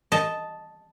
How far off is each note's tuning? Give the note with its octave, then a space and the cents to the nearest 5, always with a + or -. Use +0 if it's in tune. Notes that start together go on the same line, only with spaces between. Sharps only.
D#5 +5 A5 -5